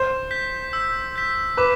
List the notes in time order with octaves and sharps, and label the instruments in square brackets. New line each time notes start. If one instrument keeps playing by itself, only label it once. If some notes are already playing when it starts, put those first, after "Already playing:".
Already playing: [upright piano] C5
[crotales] G6 B6
E6
G6 B6
[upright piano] B4 [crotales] D6